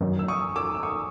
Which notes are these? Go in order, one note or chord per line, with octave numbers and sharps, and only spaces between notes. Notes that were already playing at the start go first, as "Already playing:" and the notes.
F#2 D#3 F#3
E6
C#6 D#6
D6 E6
E6
C#6 D#6